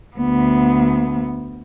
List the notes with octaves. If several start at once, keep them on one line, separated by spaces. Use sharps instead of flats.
D2 B3